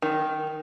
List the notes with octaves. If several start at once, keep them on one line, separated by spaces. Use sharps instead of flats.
D#3